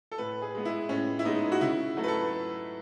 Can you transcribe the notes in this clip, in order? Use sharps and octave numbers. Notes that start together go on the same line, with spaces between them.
A4
A2 B4
G#4
G#3 B3
E4
A2 C#4
E4
G#3 B3 D#4
F#4
C#3 E4
F#3 A3
B4
A4